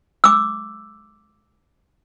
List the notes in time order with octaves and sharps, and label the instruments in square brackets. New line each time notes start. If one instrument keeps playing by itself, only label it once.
[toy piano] D6 E6